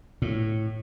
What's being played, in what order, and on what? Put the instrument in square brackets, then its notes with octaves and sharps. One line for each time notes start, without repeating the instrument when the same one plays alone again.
[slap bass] A2